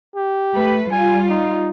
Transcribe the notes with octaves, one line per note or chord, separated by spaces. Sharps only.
G4
A3 B4
G3 F4 G#5
D#4